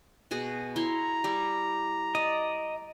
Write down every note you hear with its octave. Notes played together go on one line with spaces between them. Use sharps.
B2 F#4 G#4
E4 C#5 A#5 C6
G3 E4 G4
D5 D#5